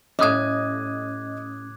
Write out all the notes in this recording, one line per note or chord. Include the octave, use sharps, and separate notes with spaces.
A2 G3 C#4 D#5 D6 D#6 F#6 G#6